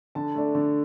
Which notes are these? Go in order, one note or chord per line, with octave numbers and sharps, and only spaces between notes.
D3 A5
A3 D4
D3